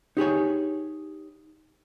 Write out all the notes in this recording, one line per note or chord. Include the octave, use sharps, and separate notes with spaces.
D#4 G4 G#4 C#5